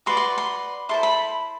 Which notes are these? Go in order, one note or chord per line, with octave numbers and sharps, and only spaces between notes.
F#4 B4 D5 C6
C6
C6
E4 A4 C5 C6
B5